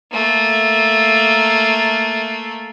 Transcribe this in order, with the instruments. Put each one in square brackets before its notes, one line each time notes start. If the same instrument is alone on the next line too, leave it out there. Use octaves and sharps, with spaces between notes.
[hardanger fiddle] A3 A#3